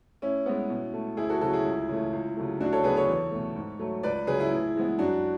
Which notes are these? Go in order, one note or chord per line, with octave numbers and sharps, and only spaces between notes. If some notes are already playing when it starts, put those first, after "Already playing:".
A2 C#4 E4
G#3 B3
B2
A3
D2 E4 G#4
F#4 A4
C#3 F#3 A3 F#4 A4
E4 G#4
C#2
C#3 E3 A3
C#2
C#3 F#3 A3
D2 D4 F#4
A4 C#5
C#3 F#3 B3 G#4 B4
A4 C#5
E2
B2 A3
G#2
F#3 A3
C#2 B4 D5
C#3 F#3 G#4 B4
E4 G#4
A2
E3 G#3 B3
F#2 D4 F#4